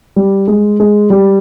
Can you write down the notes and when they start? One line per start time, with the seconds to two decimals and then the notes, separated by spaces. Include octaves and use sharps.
0.16 G3
0.48 G#3
0.80 G#3
1.10 G3